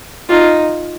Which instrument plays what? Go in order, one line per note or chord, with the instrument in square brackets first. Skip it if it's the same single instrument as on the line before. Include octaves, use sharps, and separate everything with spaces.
[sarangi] D#4 [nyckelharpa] F4